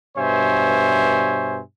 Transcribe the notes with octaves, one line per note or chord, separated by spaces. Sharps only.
G2 B2 C5 C#5 E5 G#5